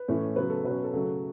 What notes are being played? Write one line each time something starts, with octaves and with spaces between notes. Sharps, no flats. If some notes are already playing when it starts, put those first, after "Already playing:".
Already playing: B4
A2 E3 A3 C#4
C#3 F#3 B3 B4
A4
B2 F#3 C#4 B4
A4
C#3 F#3 A3